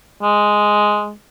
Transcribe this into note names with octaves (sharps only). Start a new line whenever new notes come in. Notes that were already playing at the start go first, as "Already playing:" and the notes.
G#3